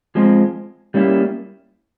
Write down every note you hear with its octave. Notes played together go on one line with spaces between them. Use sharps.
F3 G#3 C4
G3 A#3 C#4 E4